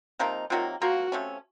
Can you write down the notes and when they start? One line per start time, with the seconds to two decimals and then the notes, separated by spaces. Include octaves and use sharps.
0.19 C3 F3 A#3 D#4
0.50 C3 D#3 F#3 A#3 F4
0.82 F3 A#3 F4 F#4 A#4
1.12 C3 F3 A3 C#4